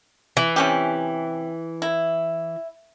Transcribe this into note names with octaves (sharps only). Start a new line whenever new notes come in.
E3
C3 C#4 G4
E4